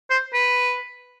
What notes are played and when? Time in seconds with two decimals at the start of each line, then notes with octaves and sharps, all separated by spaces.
0.10 C5
0.34 B4